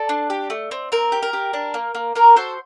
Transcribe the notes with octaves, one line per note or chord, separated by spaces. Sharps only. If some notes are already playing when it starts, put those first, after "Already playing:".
Already playing: A4 D5
D4
G4
A3
C4
C4 A#4
G4
A#4
G4
D4
A#3
A#3
A#3 A#4
F#4 A4 C5